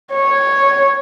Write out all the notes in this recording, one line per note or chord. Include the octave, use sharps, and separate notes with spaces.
C#5